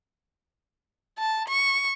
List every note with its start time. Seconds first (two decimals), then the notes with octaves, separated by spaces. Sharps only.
1.18 A5
1.48 C#6